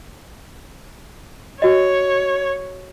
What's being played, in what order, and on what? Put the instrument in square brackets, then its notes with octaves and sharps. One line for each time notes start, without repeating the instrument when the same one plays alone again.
[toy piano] F#4 D#5 [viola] C#5